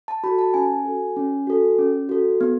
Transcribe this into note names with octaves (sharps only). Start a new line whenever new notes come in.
A5
F#4 A4 B5
A5
C#4 G#5
F#4 A4
C#4
F#4 A4
C#4
F#4 A4
B3